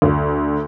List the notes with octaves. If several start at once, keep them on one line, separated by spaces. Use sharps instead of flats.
D2